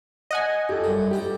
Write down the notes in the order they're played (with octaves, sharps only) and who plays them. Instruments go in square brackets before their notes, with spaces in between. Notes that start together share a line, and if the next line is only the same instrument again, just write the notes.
[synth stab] D#5 F#5 G#5
[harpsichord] F2 [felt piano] G4 A4
[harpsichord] F#2 G3
[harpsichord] D2 A4 A#5 [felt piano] G4